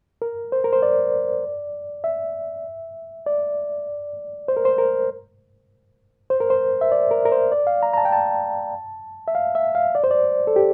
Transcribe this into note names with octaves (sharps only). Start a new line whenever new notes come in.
A#4
C5
A#4
C5
D5
E5
D5
C5
A#4
C5
A#4
C5
A#4
C5
E5
D5
A#4
A#4
C5
D5
F5
A#5
A#5
A5
G5
A5
E5
F5
E5
F5
D5
C5
D5
A4
G4